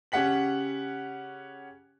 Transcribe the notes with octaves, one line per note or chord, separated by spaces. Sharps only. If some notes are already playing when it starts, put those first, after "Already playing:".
C#3 C#4 G4 F#5 B6 F#7